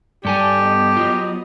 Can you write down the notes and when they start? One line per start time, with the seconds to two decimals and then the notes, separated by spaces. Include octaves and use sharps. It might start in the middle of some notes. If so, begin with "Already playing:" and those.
0.25 G2 G4 A4 D5 G#5
0.61 B3 D#5
0.97 F#3 F4